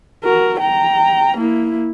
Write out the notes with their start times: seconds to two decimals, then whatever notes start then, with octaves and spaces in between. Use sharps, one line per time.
0.24 F#4 A#4
0.60 G5 A#5
1.38 A#3 E4